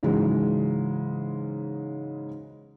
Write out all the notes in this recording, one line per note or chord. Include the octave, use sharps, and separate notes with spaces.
G#2 C#3 E3 F#3 G#3